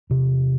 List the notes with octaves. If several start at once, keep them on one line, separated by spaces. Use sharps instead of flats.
E2 C3